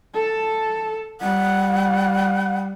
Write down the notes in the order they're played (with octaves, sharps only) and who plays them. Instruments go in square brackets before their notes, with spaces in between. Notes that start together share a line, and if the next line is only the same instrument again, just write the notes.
[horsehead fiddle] A4 A5
[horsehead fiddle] G3 [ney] F#5